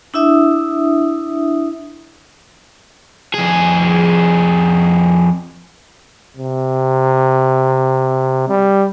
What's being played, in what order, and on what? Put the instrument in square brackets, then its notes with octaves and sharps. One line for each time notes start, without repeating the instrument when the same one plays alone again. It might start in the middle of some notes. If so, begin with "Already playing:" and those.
[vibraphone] D4 E4 E5 D#6
[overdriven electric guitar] F2 G#4
[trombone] C3
G3